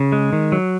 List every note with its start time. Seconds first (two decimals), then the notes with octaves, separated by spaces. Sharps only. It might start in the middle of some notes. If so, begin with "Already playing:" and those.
Already playing: C#3
0.12 G#3
0.33 D#3
0.52 F#3